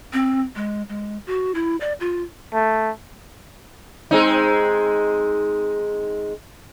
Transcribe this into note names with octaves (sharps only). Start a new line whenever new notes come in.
C4
G#3
G#3
F#4
E4
D5
F4
A3
G#3 C4 D#4